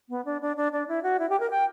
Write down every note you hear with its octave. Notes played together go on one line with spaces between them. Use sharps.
B3
D4
D4
D4
D4
E4
F#4
E4
G4
A#4
G5